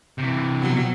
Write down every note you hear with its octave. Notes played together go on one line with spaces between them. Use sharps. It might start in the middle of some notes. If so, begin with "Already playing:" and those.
C3 E3
B2 F#3